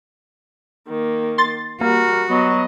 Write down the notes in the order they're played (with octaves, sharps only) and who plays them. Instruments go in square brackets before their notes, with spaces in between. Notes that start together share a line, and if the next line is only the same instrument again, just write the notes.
[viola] D#3 A#3
[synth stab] C6 A6
[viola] G3 [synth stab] A#3 [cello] F#4 [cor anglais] A#4
[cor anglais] F#3 [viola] B3 D#5